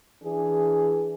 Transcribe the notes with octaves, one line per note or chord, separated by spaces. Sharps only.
E3 D4 G#4